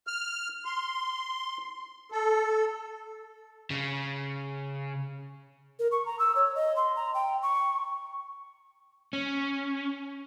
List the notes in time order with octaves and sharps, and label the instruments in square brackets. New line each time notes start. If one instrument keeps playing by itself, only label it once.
[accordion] F6
C6
A4
[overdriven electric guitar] C#3
[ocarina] A#4
C#6
A#5
E6
C#5
D#5
C6
A#5
G5
C#6
[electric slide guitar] C#4